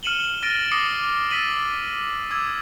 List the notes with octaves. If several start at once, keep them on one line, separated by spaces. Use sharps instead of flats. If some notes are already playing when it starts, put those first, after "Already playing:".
F6 C#7 D#7 E7 F#7 G7
F6 A6 A#6 D7 D#7 G7
D6 D#6 A#6 C7 C#7
E6 A6 B6 D#7 F#7
D6 E6 G#6